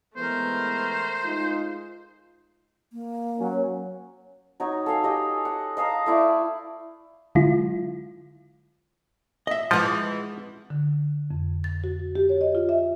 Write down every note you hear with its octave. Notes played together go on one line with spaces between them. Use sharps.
E3 G#3 A3 B3 A#4 C5
G#3 D#4 F4
A#3
F#3 C#4
F#3 D#4 C#5
A4 F5 G#5
G4 D#5
F#5
D#5 F5 A5 A#5
A3 E4 D5
D3 F#3 G#3 E4 F4
D#5 E5
E3 F3 G#3 F#5 C6
D3
F2
A6
F#4
G4
C#5
D#5
F4
E5